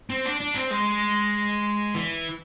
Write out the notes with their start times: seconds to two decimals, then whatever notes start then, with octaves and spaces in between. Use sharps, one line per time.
0.10 C4
0.25 D4
0.41 D4
0.55 C4
0.71 G#3
1.95 E3